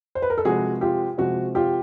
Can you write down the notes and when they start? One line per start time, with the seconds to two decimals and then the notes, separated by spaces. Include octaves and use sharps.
0.15 C5
0.22 B4
0.30 A#4
0.38 A4
0.45 C3 F3 G#3 F#4 G#4
0.81 F4 G4
1.18 C3 F3 G#3 F#4
1.55 F4 G4